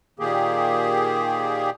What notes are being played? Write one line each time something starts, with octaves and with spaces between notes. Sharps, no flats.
A#2 D#3 A#3 G4 G#4